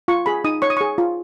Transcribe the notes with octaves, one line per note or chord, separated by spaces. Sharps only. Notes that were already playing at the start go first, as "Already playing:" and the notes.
F4 C#6
G#4 B5
D#4 D#6
C#5 C#6
D#6
G#4 C#6
F4